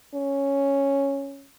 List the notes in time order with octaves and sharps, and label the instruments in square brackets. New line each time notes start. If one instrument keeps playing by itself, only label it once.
[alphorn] C#4